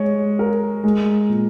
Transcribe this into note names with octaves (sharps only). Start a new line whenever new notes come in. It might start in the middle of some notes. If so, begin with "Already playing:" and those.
Already playing: G#3 C#5
A#4
G#3
A#2